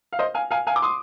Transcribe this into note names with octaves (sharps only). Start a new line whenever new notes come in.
F5
C5 D#5
F5 G#5
F5 G#5
F5 G#5
D6
C6 D#6